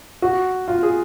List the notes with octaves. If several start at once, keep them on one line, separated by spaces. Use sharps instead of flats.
F#4
F4
G#4